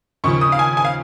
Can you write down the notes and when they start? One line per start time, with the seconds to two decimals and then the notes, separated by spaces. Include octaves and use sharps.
0.24 D#2 C#3 F3 C#6
0.41 D#6
0.52 F5
0.59 G#5
0.77 G#5
0.85 F5